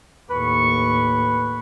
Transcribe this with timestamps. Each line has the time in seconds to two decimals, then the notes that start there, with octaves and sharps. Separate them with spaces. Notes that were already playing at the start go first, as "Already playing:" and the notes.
0.30 D#2 A2 B4 C#6